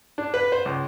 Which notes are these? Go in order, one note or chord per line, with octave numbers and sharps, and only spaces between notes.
D4
B4
C5
C#2